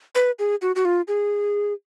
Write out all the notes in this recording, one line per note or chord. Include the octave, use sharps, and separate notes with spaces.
B4
G#4
F#4
F#4
F4
G#4